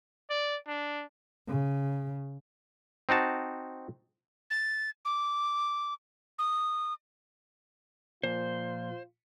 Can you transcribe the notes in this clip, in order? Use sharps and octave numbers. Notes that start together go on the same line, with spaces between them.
D5
D4
C#3
C4 D#4 F#4 A5
A6
D6
D#6
A#2 F3 F4 C5